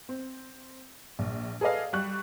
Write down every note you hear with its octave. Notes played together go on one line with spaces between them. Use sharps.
C4
A#1
G#4 A4 B4 D5 D#5 F5
G3 G4 C#6 F#6